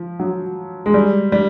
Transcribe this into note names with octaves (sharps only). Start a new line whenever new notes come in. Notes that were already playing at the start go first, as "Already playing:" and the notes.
Already playing: F3
F#3
G#3
G3
G3